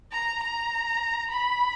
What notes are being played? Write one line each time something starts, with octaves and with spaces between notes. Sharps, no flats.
A#5
A#5
B5